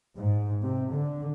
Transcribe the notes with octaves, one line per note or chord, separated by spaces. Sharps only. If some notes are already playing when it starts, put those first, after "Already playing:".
G#2
C3
D3